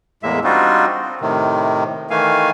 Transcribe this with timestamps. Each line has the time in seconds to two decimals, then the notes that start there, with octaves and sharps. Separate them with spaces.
0.23 E2 A2 G#3 A#3 E5
0.44 G3 C4 D4 D#4 F4 F#4
1.02 C4
1.21 A2 C3 D#3
2.10 D#3 E3 A3 F5 G#5